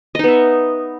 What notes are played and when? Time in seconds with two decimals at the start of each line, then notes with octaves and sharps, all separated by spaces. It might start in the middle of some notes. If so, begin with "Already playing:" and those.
0.15 D#5
0.19 D#4
0.24 B3
0.28 E5